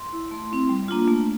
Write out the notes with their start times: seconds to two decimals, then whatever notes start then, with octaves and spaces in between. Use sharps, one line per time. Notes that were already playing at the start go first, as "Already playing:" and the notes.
Already playing: C6
0.13 E4
0.31 A3 C6
0.51 C4 E4
0.69 G3
0.88 A#3 D4 F4
1.08 A3